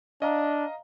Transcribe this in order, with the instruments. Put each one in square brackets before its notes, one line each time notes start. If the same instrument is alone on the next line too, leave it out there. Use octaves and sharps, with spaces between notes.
[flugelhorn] D4 [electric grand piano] D#5 F5 A#5